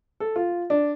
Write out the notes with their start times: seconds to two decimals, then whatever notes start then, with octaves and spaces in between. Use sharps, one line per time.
0.20 A4
0.36 F4
0.70 D4